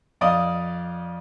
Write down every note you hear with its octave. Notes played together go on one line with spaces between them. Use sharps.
F2 D5 D#5 F5 D#6